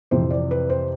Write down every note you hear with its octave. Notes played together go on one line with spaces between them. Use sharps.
F2 C3 E3 C5
D5
B4
C5